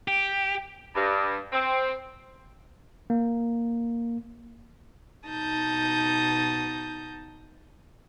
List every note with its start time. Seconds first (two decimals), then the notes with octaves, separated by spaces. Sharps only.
0.08 G4
0.95 G2
1.51 C4
3.10 A#3
5.28 B2 D#4 A5 D#6 G6